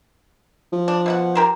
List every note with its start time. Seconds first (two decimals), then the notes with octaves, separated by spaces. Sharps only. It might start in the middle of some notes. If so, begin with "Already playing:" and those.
0.73 F3
0.88 D4
1.06 B2 E4 F#5
1.35 G4 A#4 C5